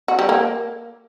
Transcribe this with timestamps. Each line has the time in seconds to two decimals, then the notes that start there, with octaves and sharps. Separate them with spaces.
0.08 F#4
0.19 G3
0.29 A#3